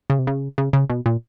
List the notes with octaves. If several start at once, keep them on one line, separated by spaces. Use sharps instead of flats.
C#3
C3
C#3
C#3
C#3
B2
A#2